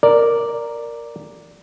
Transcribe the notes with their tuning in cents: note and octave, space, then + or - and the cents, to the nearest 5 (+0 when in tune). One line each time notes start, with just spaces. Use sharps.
A#4 +0 D5 +0